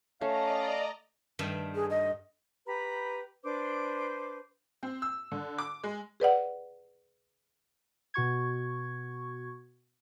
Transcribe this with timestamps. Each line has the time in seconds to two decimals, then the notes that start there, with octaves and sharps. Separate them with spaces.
0.21 A3 C#4 D5 D#5 F5 A#5
1.39 G2 D#3 A3
1.75 G#4
1.90 D#5
2.66 G4 B4 A#5 B5
3.43 D4 B4 C5 D6
4.83 C4
5.02 E6
5.32 D3
5.58 D6
5.83 G#3
6.20 G#4 B4 D5 F#5
8.14 B2 F#4 C#6 G#6